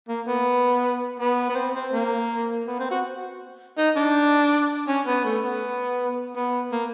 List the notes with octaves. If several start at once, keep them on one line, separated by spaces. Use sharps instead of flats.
A#3
B3
B3
B3
C4
C4
A#3
B3
C4
F#4
D#4
D4
C#4
B3
A3
B3
B3
A#3